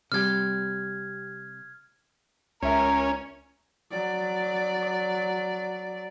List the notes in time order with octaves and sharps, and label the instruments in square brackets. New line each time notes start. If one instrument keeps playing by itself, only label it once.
[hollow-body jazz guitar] C3 G3 G4 [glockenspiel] F6 G#6
[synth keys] C#2 E5 [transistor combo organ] C#4 [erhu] A#4
[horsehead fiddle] F#3 D5